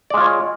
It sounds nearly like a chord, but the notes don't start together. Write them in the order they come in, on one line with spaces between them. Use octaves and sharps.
D5 G#3 F4 C#5